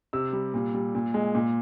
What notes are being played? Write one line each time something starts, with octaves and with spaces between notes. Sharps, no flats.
C3 E6
G3
A#2
G3
A#2
G#3
A#2